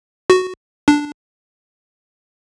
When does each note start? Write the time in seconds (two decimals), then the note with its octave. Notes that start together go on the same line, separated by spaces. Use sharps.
0.30 F#4
0.88 D4